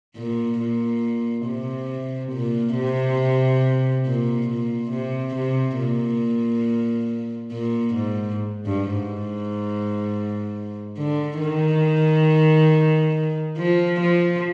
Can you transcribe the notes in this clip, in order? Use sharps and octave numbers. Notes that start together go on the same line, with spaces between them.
A#2
A#2
C3
A#2
C3
A#2
A#2
C3
C3
A#2
A#2
G#2
G2
G#2
D3
D#3
F3
F3